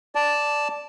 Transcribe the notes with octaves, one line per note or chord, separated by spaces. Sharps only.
D5 A5